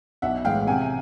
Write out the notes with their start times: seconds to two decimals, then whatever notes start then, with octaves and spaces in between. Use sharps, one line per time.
0.22 B1 E5 F#5
0.44 A2 E3 G#3 F5 G5
0.67 C3 F#5 G#5